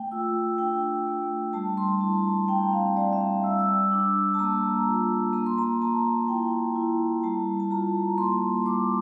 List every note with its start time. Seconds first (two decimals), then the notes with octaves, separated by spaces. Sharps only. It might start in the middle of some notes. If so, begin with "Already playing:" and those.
Already playing: A3 G5
0.11 F4 E6
0.58 D4 G5
1.07 A3
1.53 G3 A5
1.77 C6
2.01 E4 A5
2.25 A#5
2.48 C4 G5
2.73 F5
2.97 G3 D5
3.13 E5
3.21 F5
3.43 G3 E6
3.59 E6
3.91 D4 D6
4.34 A5
4.39 A#3 A#5
4.86 F4
5.33 A#3 A#5
5.46 C6
5.58 A#5
5.82 A#3 A5
6.28 E4 G5
6.76 E4
7.23 G3 A5
7.60 A5
7.70 F4 A#5
8.18 A#3 C6
8.65 G3 D6